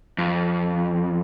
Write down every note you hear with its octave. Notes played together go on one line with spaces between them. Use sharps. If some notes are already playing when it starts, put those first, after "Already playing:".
F2